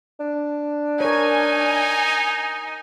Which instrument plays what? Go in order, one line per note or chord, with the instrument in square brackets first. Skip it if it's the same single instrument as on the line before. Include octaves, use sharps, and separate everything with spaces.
[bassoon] D4
[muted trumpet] D#4 [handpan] A#4 C#5 [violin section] G#5